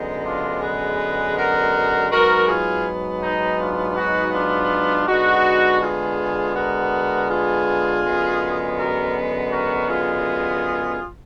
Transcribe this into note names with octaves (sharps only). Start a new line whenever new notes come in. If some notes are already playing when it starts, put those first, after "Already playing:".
Already playing: F#2 D3 G#3 B3 D#4
D4 F4
G#4 B4
F#4 A#4
G#2 F#3 B3 F#4 A#4
F4 G#4
D#4
D4 F4
D#4 F#4
D4 F4
D3 G#3 B3 D#4 F#4
F4 G#4
F#4 A#4
F4 G#4
F#2 D3 G#3 B3
F#4 A#4
F#4 A#4
F4 G#4